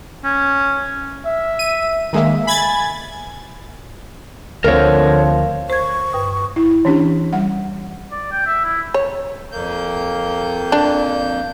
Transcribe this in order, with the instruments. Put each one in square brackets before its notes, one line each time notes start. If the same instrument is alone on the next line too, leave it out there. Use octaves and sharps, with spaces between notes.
[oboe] C#4
[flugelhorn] E5
[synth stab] D#7
[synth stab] D#3 G#3 A#3 [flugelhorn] E5
[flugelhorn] G#5 [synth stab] B5 G#6 A6
[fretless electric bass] D2 C4 [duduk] D3 [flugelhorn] F3 [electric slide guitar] A#4 C#5
[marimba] C5 G#6 [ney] C#6
[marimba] G2 B4 D#6
[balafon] E4
E3 C#4 D4 G4
G3 F#5
[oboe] D5
G5
E5
E4
[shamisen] C#5
[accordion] F2 A#3 G6
[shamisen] D4